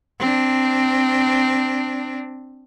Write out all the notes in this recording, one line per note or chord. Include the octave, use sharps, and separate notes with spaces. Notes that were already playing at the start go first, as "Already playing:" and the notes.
C4 D4